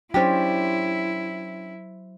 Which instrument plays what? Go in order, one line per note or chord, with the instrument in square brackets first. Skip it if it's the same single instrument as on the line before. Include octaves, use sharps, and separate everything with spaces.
[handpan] F#3 C5 [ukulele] C#4 D4 G4 [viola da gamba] E4